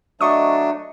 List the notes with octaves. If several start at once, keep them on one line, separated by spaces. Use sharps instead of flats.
F#3 A3 D4 D#5 C#6 D#6